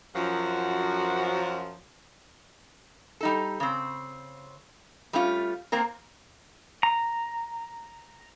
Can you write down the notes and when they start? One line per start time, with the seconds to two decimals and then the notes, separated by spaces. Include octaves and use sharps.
0.16 F#2 F3 F#4
3.21 G3 D#4 A4
3.60 C#3 C4
5.13 G3 A3 C#4 F4
5.72 A#3 C4 A#4
6.83 A#5